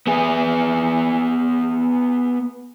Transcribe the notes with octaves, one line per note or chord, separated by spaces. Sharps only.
B3 G#4